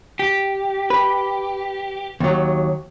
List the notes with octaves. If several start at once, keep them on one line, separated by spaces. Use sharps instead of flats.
G4
B4
D#2 F#3